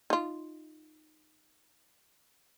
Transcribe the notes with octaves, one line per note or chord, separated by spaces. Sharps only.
D#4 F4